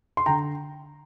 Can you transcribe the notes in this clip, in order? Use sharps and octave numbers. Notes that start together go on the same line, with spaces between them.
C6
D3 G5 A#5